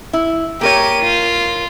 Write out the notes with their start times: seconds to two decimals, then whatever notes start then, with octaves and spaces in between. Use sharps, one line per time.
0.13 E4
0.61 A#3 G4 A#4 C#5 D#7
1.01 F4